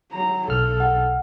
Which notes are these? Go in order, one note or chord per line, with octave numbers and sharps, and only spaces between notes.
F#3 A#5
B1 A4 F6
F#5